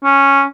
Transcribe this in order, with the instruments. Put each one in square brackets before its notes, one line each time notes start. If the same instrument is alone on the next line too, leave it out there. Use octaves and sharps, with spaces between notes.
[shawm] C#4